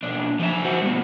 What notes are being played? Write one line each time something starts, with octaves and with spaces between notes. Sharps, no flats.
B1 D4
F3 E5
C4 F#4
G2 B2